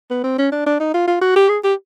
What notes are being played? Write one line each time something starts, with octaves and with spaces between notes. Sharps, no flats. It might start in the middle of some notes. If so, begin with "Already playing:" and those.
B3
C4
C#4
D4
D4
D#4
F4
F4
F#4
G4
G#4
G4